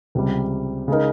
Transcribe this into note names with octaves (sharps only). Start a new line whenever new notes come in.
C#2 C3 G3
C#3 G#3 D#4 A#4